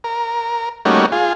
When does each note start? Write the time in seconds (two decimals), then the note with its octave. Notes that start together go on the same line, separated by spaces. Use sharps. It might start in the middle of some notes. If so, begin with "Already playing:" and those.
0.04 A#4
0.85 G3 A3 A#3 C#4 D#4 F#4
1.12 F4 G#4